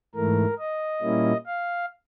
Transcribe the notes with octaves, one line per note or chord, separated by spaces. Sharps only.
G#2 E3 A3 A#4
D#5
A#2 G3 A#3 C#4 E4
F5